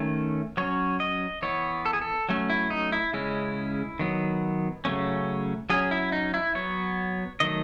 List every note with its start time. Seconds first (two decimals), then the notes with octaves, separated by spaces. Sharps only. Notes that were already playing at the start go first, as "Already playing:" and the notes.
Already playing: D#3 A3 C#4
0.57 F#3 C#4 C#5
1.00 D#5
1.42 E3 B3 C#5
1.86 A4
1.93 G#4
2.01 A4
2.29 F#3 A3 C#4
2.50 E4
2.70 D#4
2.92 E4
3.13 C#3 G#3 C#4 E4
3.99 D#3 F#3 B3
4.85 C#3 F#3 A3 C#4
5.70 F#3 C#4 G#4
5.91 E4
6.12 D#4
6.34 E4
6.55 F#3 B3 C#5
7.40 D#3 F#3 A3 D#5